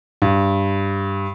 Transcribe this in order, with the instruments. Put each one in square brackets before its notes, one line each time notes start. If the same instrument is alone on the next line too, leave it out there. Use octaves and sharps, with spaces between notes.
[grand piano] G2